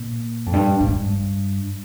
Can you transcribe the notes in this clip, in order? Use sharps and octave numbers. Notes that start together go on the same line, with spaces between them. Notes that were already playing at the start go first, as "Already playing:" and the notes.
Already playing: A#2
F2
G2
G#2
G2